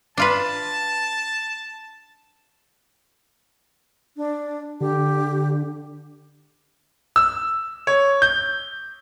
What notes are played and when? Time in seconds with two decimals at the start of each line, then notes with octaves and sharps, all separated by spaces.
0.17 D4 F4 B4 A5
4.17 D4
4.81 D3 G4
7.16 E6
7.87 C#5
8.22 G6